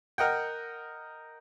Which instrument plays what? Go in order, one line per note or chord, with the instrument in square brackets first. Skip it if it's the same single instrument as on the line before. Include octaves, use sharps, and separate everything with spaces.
[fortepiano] A#4 D#5 F#5 G5